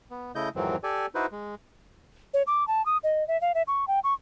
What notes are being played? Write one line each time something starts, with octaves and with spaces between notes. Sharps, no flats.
B3
C#3 A3 E4 D#5 G6
F2 G#2 D#3 E3 F#3 C4
G4 A4 D5 G#5
D#4 E4 F#4 B4 C5
G#3
C#5
D6
A5
D#6
D#5
E5
F5
E5
C#6
G5
C#6